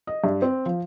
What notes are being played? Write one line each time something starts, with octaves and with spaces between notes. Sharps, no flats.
D#5
G2
C4
F3